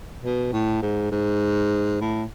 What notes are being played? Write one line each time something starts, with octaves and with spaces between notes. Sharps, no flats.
B2
A2
G#2
G#2
A2